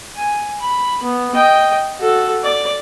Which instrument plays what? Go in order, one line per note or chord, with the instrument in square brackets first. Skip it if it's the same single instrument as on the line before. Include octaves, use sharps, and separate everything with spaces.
[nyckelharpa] G#5
B5
B3
D#5 G5
F#4 A4
D5